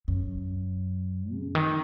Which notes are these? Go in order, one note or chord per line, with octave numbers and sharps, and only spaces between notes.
F#2
C#3
D#3